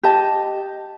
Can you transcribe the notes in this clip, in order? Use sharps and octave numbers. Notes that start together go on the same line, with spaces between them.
G4 D#5 A5